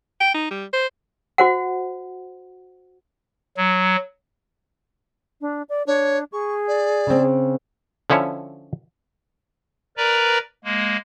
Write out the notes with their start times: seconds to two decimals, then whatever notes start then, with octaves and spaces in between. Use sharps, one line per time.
0.20 G5
0.34 D#4
0.51 G3
0.73 C5
1.38 F#4 C5 F#5
3.57 F#3
5.41 D4
5.69 D5
5.87 D4 C#5
6.32 G#4 C#6
6.67 D5
7.07 C#3 C4
8.10 D3 F3 C#4 E4 C#5
9.97 A#4 B4 D5 A#5
10.65 G#3 A#3